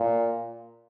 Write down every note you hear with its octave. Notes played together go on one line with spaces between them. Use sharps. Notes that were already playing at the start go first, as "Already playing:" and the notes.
Already playing: A#2